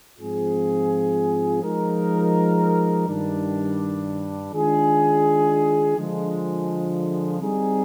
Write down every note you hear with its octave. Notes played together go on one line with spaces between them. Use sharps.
G#2 F3 C4 F4 G#4
F3 G#3 D#4 A#4
G2 D#3 G3 D4
D#3 G#3 D4 F4 G#4
D3 F3 G#3
G3 C4 D#4 G#4